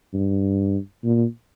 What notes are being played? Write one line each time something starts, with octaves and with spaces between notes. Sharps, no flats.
G2
A#2